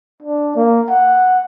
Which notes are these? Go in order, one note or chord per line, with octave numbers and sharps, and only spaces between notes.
D4
A#3
F#5